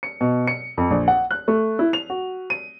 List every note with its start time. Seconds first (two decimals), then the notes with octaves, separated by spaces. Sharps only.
0.03 C#7
0.21 B2
0.47 C#7
0.77 F2
0.91 A#1
1.08 F#5
1.31 F#6
1.48 A3
1.79 E4
1.93 F7
2.10 F#4
2.50 D#7